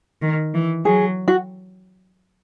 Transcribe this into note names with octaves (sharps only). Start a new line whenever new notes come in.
D#3
E3
F#3 G#4
F#4